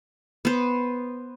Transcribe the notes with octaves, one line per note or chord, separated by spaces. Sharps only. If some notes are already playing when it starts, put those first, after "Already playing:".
B3 C5